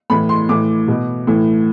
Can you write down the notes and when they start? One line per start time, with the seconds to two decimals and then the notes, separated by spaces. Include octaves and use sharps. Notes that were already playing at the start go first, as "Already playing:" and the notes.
0.10 A2 E3 B5
0.29 C6
0.49 A2 E3 D6
0.88 B2
1.27 A2 E3